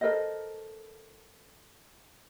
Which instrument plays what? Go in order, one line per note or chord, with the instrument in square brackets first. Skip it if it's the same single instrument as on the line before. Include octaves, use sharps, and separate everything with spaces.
[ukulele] A4 A#4 C5 D#5